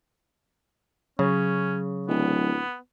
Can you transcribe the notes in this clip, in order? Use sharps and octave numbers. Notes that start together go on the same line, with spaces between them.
C#3 F#3 C#4
D1 B3